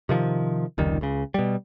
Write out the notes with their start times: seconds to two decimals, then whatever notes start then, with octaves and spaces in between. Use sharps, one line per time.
0.09 C3 D#3 F3
0.78 F1 C#2 D#3 G3
1.01 C#2 C#3
1.34 B2 G3